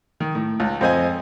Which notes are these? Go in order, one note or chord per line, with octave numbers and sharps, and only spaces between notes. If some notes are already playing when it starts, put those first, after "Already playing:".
D#3
A2
C#2
F2 C4 C5 D#5 G#5